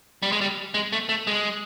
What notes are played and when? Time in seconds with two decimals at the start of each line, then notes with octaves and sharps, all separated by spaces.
0.23 G3
0.32 G#3
0.41 G3
0.74 G#3
0.92 A3
1.09 A3
1.27 G#3